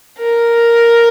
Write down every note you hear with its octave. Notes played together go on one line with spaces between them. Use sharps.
A#4